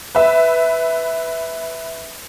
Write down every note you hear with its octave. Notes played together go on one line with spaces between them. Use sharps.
B4 E5